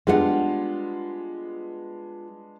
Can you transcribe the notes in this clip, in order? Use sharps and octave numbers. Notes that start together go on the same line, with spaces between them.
G3 G#3 B3 D4 F4 F#5